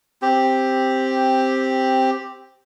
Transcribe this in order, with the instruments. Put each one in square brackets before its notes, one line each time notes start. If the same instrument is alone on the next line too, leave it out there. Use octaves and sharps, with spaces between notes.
[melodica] C4 G4